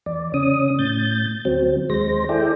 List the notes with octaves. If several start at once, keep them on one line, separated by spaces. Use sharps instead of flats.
E2 D5
C#3 C#4 D#6
A2 G6 A6
D2 F#3 C4
D#2 G#3 C5 A#6
E4 G#4 A4 D5 G5